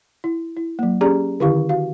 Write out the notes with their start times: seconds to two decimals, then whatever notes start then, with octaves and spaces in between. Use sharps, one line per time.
0.24 E4
0.57 E4
0.79 F#3 A#3
1.01 C#4 G4 G#4 D5 A#5
1.40 D3 D#3 E4 G4 F5 C#6
1.69 F#4 F5